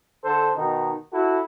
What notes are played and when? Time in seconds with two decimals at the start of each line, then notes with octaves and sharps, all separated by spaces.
0.23 D3 A4 C5
0.56 B2 D#3 D#4
1.11 E4 F#4 A4